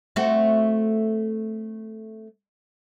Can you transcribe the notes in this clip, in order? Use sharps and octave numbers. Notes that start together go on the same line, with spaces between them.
A3 C4 F#4